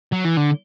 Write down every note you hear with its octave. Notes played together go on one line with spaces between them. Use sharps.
F#3
E3
D3